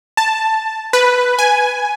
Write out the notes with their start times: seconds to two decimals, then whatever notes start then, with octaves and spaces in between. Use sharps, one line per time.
0.17 A5
0.93 B4
1.39 G#5